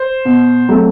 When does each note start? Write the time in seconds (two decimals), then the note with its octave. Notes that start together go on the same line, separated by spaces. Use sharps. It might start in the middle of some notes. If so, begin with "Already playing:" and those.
Already playing: C5
0.25 B2
0.69 F#3 A3 C4